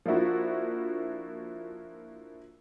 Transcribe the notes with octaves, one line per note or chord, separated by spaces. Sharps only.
F3 A#3 D4 E4 F#4